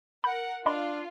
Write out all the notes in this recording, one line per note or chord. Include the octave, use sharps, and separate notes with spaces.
A#4 F#5 B5 G6
D4 F4 D#5 B5 C6